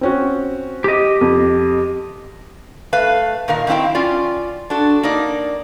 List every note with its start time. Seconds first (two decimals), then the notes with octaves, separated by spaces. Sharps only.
0.01 C4 C#4 F#4
0.84 G4 D#5
1.21 F2
2.93 A3 B4 F5
3.48 A#2 D#3 A#4 F5
3.67 D#3 F#3 C4 E4 F5 G5
3.95 C#4 F4 D5
4.70 D4 F#4 A4
5.03 A#3 D#4 D5